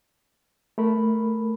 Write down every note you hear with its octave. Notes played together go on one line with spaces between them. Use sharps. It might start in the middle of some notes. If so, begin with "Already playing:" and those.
A3 A4 A#4 B5